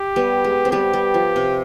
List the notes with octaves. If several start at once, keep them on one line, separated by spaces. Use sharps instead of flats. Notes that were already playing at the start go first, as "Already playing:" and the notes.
Already playing: G4
G3 B3
G#3
C4
G3 B3 G4
G3
F3
C3